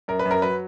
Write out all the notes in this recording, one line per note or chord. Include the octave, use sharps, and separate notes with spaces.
F#2 A#4
B4
F#2
A#4
F#3 B4